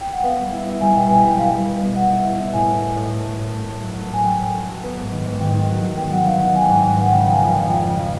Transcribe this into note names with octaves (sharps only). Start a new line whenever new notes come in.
G5
F#5
B3 F5
G3
E4
E4
G3 G#5
B2 G5
B2 G#5
G3 G5
G3 F5
G3
B2
B3
B3 F#5
E4
B2
E4
A2 G#5
A2
A2
A2
A3
A3
A2
A3
A2
F#3
A3
A2 G#5
F#3 G5
A2
A3
F#3
B3
G#2
D#3
G#2
D#3 G5
D#3
F#3
F#3
B3 G5
F#3 F#5
D#3 F5
D#3 F#5
F#3 G#5
G5
G#2 G#5
G#2
B3 F#5
C#3 G5
F3 G5 G#5
F2
F2 G5
F3 G5
C#3
F3